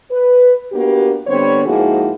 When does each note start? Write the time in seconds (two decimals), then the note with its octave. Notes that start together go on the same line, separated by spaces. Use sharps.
0.11 B4
0.72 A#3 B3 D4 F#4 G4
1.27 D3 G3 B3 C4 C5 C#5
1.65 G#2 F3 A#3 E4 F#4 G#4